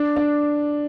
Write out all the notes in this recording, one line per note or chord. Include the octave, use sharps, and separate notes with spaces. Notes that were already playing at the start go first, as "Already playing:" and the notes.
Already playing: D4
D4